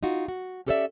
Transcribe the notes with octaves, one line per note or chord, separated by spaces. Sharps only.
D#4 F4 F#4
F#4
C#4 G4 A4 B4 D5 E5